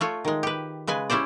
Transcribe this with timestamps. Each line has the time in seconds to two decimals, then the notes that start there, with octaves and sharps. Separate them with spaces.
0.01 A3 F4 C#5
0.25 D#3 G#3
0.43 G4 B4
0.87 C#3 G#3 B4 G#5
1.10 C#4 E4 G4 C5 D5